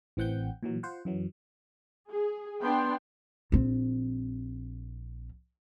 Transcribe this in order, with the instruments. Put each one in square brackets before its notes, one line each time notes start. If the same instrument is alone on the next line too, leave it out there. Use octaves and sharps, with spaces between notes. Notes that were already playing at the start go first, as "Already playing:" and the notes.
[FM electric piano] A1 E3 C4 F#5 G5 G6
A#2 E3 F#3
F4 C5 F#5
F#2 E3 F#3
[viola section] G#4
B3 D4 G5 C6
[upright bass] A#1 C4